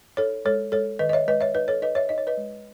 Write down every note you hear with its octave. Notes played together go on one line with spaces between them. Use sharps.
D#4 A4 C#5
G#3 A4 C#5
G#3 A4 C#5
D#3 B4 D#5
D#5
C#5 E5
G#3 B4 D#5
C#5 E5
D#4 B4 D#5
A4 C#5
D#4 B4 D#5
C#5 E5
D#4 D#5
C#5
B4 D#5
G#3